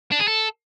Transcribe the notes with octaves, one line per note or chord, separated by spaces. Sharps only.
D4
G#4
A4